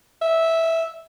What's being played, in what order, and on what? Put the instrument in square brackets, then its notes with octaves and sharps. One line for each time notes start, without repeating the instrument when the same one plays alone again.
[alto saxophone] E5